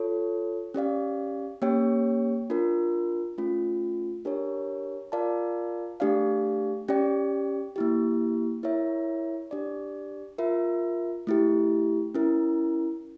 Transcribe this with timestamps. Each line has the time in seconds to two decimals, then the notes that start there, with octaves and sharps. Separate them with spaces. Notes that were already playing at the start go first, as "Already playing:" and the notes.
Already playing: F4 A4 C#5
0.74 C#4 G4 D5 F5
1.62 A#3 C#4 G4 C#5 G5
2.50 D4 F4 A#4
3.38 A3 C#4 F4
4.25 D4 G4 A#4 C#5
5.12 F4 A#4 D5 F5 A5
6.00 A3 D4 G4 D5 F5
6.88 C#4 G4 D5 G5
7.76 A#3 E4 G4
8.63 E4 A#4 C#5 E5
9.51 D4 G4 D5
10.38 F4 A#4 E5
11.27 A3 E4 G4
12.14 C#4 E4 A#4